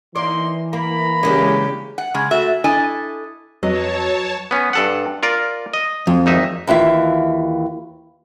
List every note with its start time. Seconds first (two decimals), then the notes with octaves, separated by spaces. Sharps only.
0.16 E3 A#3 D#4 D5 C6
0.73 A#3 A#5 B5
1.23 C#3 G#3 A#3 D4 G4
1.98 F#5
2.14 C#3 G#3
2.31 A3 F#4 E5
2.64 D4 E4 A4 D#5 G#5
3.63 F2 F#3 B4 C#5 D#5 A5
4.51 B3 C#4
4.73 G2 A4 F#5
5.23 F4 A#4 D5
5.74 D#5
6.07 F2
6.26 G#1 D#4 E5
6.67 D#2 E3 F4 E5